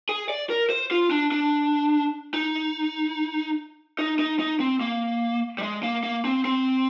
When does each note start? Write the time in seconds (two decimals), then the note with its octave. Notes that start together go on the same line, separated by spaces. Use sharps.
0.09 G#4
0.29 D5
0.50 A#4
0.70 C5
0.91 F4
1.11 D4
1.32 D4
2.34 D#4
3.99 D#4
4.19 D#4
4.39 D#4
4.60 C4
4.81 A#3
5.58 G3
5.62 G#3
5.83 A#3
6.03 A#3
6.25 C4
6.45 C4